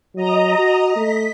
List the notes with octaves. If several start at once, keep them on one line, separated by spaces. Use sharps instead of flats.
F#3 D#5 A#5
F#4
A3 B6